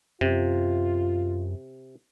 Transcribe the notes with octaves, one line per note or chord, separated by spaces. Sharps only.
F#2 C3 F4